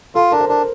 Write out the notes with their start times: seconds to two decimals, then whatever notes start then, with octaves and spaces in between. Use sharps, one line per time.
0.15 F4 A4
0.32 D4 A#4
0.40 C5
0.49 D4 A#4